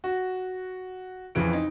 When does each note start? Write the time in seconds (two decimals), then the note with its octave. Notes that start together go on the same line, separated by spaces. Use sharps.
0.04 F#4
1.35 F2 C#3 E3 D7
1.53 D#4